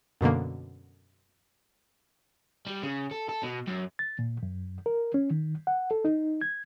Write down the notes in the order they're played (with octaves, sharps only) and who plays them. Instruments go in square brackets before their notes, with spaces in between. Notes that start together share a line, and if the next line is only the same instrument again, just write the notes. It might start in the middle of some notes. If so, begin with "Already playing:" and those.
[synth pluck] F#2 B2 D3 A#3
[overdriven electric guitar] G3
C#3
A4
A4
B2
F#2
[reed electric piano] A6
A#2
F#2
A#4
C#4
D#3
F#5
A4
D#4
G#6